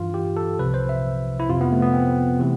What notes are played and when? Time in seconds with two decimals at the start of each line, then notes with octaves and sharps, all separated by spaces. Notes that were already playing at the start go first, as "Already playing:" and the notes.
Already playing: G2 E3 F4
0.14 G4
0.37 A4
0.59 C2 C3 F3 B4
0.74 C5
0.89 E5
1.40 E4
1.48 F2 C3 F3 F4
1.61 B3
1.72 A3
1.82 B3
1.94 C4
2.40 C3 E3